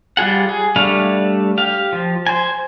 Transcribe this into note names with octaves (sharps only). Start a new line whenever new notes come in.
G3 F4 G#4 F#5
G#4
G3 A3 D4 F5
G4 F5
F3
C5 G#5